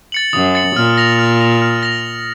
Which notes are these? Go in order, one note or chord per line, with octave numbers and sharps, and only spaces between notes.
A6 C#7 F#7
F#2 D#6
A6 C#7 F#7
A#2 F6
A#6 F7
F6
A#6 F7
F6
A#6 F7